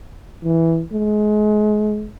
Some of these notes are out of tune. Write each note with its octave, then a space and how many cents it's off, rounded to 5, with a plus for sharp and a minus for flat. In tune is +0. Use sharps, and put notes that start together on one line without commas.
E3 -5
G#3 +30